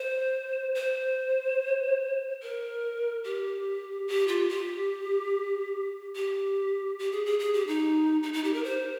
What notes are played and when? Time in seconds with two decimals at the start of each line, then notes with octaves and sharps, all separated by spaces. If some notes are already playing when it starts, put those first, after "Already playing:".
Already playing: C5
0.75 C5
2.42 A#4
3.24 G4
4.08 G4
4.28 F4
4.49 G4
6.16 G4
6.99 G4
7.12 G#4
7.26 G#4
7.39 G#4
7.53 G4
7.67 D#4
8.23 D#4
8.33 D#4
8.44 G4
8.53 A#4
8.64 C5